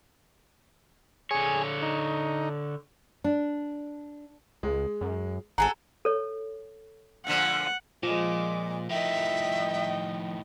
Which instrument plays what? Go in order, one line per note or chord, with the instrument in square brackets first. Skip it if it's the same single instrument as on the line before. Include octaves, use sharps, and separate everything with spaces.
[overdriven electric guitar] D3 C#5 [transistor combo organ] G#4
[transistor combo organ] D#4
[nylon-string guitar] D4
[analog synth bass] C#2 [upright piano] G#3
[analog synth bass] F#2
[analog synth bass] G#1 [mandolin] F#4 G#4 A4 [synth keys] A#5
[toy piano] A4 C#5
[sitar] A#2 D3 F3 [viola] F#5
[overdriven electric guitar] A#2 [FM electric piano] F3 [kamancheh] G#3 D6
[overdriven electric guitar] A2 D#3 [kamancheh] D#5 G5 [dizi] E5